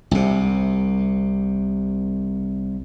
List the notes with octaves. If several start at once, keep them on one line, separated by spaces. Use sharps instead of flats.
C2 C3